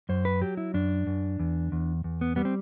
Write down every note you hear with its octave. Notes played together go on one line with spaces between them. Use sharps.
F#2 C5
B4
F#3 G4
E4
F#2 D4
F#2
E2
E2
E2
B3
G3 B3
C4